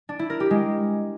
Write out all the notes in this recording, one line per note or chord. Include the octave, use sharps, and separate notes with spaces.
D4
E4
A#4
G4
G#3